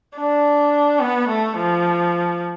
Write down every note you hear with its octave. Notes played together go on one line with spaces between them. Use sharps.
D4
B3
A3
F3